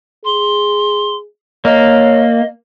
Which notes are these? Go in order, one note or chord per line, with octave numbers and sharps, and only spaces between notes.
G#4 C6
A#3 C#5 D#5